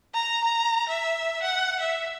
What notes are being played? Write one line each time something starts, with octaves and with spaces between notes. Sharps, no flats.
A#5
A#5
E5
F#5
E5